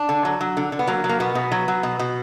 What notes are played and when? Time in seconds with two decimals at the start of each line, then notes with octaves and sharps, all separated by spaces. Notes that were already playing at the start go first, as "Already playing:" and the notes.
Already playing: D4
0.09 D3
0.25 F#3
0.41 F#3
0.57 D3
0.72 D3
0.79 B3
0.87 F#3 A#3
1.04 F#3
1.09 A#3
1.20 B2 B3
1.35 B2
1.52 F#3
1.68 F#3
1.83 B2
1.99 B2